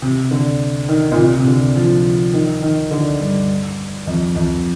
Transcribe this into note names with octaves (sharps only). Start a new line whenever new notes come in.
C3
D3
D#3
A#2
C3
C3
D3
F3
D#3
D#3
D3
G2
F2
F2